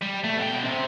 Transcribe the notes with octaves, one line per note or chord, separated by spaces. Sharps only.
G3
A3
B2 G5
C3 C4